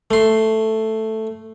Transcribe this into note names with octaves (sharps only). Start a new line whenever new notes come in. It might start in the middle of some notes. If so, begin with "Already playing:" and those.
A3 C6